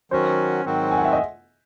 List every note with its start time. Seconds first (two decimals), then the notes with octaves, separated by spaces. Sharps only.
0.11 D#3 F#3 C#4 F#4 C5
0.65 G#2 D#3 F#3 C4 F#4
0.91 G#5
0.98 F#5
1.05 E5
1.13 D#5